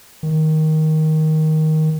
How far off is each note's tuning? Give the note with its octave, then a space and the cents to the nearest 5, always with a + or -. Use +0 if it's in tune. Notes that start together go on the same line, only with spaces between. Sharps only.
D#3 +10